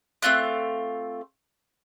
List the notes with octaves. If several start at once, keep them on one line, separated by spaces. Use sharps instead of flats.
A3 C4 F4 F#6